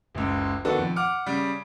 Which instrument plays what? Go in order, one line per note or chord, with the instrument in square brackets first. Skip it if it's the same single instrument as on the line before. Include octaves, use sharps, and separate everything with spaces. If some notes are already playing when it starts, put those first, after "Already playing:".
[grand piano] F#1 C#2
D#3 B3 D4 F#4 A4
F2
F#5 D6 F6
C#3 G3